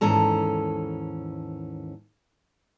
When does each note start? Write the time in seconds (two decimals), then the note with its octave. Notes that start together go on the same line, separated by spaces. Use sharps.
0.01 D#2 G#2 E3 C#4 A4 A#5